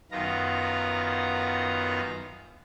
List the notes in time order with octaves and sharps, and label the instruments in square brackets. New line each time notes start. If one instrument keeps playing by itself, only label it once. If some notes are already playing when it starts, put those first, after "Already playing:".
[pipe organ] F#2 D#3 B3 F4 A#5